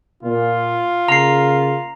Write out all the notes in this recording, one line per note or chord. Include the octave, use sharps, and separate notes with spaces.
A#2 F4
C#3 A#3 A#5 C7